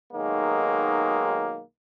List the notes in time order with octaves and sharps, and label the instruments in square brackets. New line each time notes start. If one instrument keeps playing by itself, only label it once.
[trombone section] B1 D#3 F#3 G#3 A#3